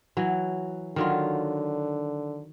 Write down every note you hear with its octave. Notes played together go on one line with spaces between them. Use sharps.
E3 F#3
D3 D#3 F#3 F4